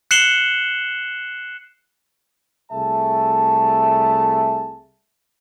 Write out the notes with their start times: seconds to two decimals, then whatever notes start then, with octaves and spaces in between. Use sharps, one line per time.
0.11 F#6 C7 C#7 E7 F#7 G7
2.71 C2 A3 G#4 E5 A5